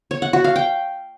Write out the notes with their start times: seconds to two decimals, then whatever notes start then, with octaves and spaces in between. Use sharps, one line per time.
0.11 C#5
0.22 F#5
0.33 F#4
0.44 F5
0.56 G5